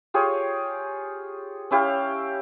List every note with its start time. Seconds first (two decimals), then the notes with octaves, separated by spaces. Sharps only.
0.14 F4 G4 G#4 C#5
1.71 C#4 E4 G4 F5